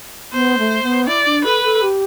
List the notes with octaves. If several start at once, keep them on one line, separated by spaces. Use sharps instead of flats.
B3 C5
A3
B3
E4 D5
D4
A4 B4
A4
G4